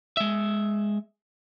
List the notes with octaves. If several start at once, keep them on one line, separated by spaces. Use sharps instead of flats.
G#3 E5